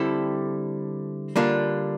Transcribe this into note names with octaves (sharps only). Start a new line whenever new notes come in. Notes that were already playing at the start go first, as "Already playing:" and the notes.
Already playing: D3 G3 C4 E4 A4
D3 G3 A#3 D4 F4